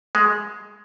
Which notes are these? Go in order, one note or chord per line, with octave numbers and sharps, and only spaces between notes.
G#3